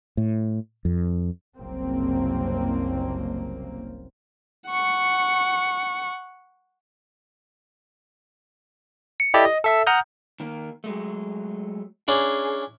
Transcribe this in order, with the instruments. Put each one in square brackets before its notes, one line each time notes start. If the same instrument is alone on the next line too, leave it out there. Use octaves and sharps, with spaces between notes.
[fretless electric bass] A2
F2
[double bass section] F#1 C2 A#3 C4
[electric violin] F#5 C#6
[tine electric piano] C#7
E4 G4 A4 D5 D#5
D#5
A4 E5 E6
F#5 A#5 D#6 F6 G6
[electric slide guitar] D#3 A#3
F#3 G#3 A3
[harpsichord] C#4 D4 E4 [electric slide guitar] G#4